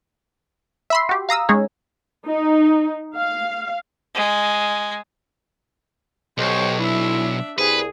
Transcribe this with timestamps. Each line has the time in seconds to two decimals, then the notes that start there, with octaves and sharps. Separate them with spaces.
0.90 E5 B5 C6
1.09 F#4 G4
1.29 F5 A#5 D#6 E6
1.49 G#3 C#4 D#4 G#4 C#5
2.26 D#4
3.16 F5
4.15 G#3
6.38 B1 G4 A4 C5 C#5 D#5
6.79 D4 E4 E5
7.58 C2 G#4 B4